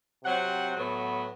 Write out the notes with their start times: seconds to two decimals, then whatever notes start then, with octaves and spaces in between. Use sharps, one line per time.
0.22 C3 F#3 C4 F#5
0.75 A2 F#3 B3